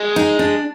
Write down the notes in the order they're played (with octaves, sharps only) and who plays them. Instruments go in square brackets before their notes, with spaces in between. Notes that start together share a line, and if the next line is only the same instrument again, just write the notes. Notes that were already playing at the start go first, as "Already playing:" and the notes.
Already playing: [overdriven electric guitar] G#3
[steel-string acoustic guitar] D#4
D4